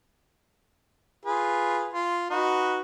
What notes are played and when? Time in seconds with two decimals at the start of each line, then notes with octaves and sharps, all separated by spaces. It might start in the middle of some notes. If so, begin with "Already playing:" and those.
1.25 F4 G#4 B4
1.93 F4
2.30 D#4 F#4 B4